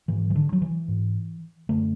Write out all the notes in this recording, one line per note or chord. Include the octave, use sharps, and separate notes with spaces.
G#2 E3
E3
D3
F#3
E3
G#2
F#2 D3 A3